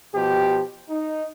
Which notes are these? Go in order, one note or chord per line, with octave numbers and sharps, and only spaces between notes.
B2 F3 G4
D#4